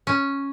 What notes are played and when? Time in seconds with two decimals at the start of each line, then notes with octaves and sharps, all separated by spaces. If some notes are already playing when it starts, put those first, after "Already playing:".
0.07 C#4